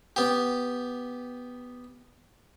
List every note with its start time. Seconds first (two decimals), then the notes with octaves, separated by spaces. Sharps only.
0.16 B3 G4